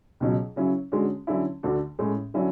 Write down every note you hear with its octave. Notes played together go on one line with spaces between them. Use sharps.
C#2 B2 F#3
C#3 F#3 C#4 E4
D3 G#3 C#4 F#4
D3 F#3 C#4 E4
D2 D3 A3 D4 F#4
A2 G#3 C#4
D3 F#3 C#4 E4